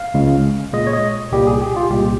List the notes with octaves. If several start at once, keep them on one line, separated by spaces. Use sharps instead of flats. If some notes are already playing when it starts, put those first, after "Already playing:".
Already playing: F5
C#2 C#3 G#3
A#2 G#3 D#5
C#5
D#5
C2 A#2 G3 A#3 G4
G#4
G4
F4
C2 A#2 G#3 G4